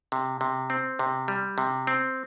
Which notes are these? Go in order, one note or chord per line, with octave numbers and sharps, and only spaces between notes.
C3
C3
C4
C3
G3
C3
C4